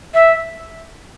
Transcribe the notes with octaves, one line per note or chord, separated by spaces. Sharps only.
E5